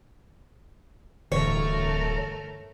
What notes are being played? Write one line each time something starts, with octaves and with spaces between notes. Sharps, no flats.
D1 G2 D3 E3 A3 A#4 C#5